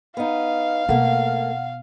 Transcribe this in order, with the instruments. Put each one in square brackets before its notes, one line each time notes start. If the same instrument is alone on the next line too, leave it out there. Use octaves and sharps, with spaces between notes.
[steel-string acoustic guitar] B3 D#4 [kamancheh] F5
[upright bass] B2 [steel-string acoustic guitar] A3 A#3 [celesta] F#5